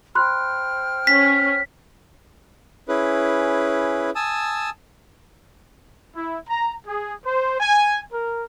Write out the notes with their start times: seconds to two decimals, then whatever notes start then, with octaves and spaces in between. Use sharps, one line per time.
0.15 C5 G5 B5 C6 F6 F#6
1.07 C#4 B6
2.88 C#4 E4 G#4 B4
4.15 G#5 A5 D#6 E6
6.16 E4
6.48 A#5
6.87 G#4
7.24 C5
7.60 G#5
8.11 A#4